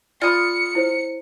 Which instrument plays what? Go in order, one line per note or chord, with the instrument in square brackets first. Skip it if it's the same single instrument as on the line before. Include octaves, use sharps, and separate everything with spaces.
[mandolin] F4 D#6 [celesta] D5 B5 [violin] C#7
[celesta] E4 C5 C#5